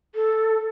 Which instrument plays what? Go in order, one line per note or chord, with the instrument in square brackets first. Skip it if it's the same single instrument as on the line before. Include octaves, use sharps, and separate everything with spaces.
[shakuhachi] A4